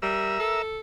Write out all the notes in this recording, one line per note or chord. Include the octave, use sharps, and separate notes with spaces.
G3 A#4 E5 E6
A4